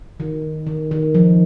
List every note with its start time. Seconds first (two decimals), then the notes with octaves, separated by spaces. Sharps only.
0.20 D#3
0.67 D#3
0.91 D#3
1.14 F3